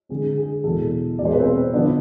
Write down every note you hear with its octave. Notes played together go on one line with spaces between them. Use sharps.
D3 G#3 C4 G#4
G#4
E2 B2 G#3 A4
E2 B2 G#3 D5
C5
B4
C4 C5
D3 F3 B3 D4 D5